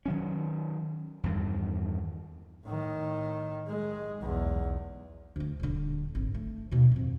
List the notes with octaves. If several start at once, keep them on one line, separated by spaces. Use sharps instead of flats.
D#3 F#3 C#4
E2 G2 D#3
A2 D#3
G#3
B1 E2
D2 A3
D#1 D3
G#1
A3
D#2 B2
F2 A2